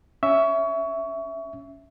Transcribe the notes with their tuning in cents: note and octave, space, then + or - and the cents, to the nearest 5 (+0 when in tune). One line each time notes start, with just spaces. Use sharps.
C#4 +15 E5 +0 C#6 +25